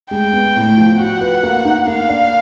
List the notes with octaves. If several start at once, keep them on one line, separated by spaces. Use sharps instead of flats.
G#3 G5
B3
A2
F3
F#4 F#5
B4
A#3
D#4
A#3 F5
D4